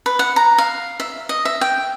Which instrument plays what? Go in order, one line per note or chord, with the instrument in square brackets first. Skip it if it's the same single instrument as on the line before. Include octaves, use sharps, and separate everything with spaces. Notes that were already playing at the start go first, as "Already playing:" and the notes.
[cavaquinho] B4
F#5
A#5
F5
E5
D#5
E5
G5